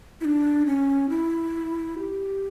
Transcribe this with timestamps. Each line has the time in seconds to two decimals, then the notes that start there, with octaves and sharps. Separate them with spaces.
0.21 E4
0.25 D4
0.66 C#4
1.09 E4
1.99 G4